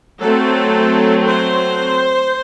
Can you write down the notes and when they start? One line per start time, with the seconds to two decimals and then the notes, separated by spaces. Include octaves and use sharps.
0.22 F#3 A3 C4 A4
1.28 C5